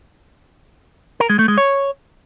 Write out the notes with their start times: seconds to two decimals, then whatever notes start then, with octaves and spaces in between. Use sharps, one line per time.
1.20 A#4
1.29 G#3
1.39 A3
1.48 G#3
1.58 C#5